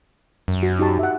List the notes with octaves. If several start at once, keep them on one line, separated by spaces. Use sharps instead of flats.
F#2
F#4
D#4 G4 A5
E5 F#5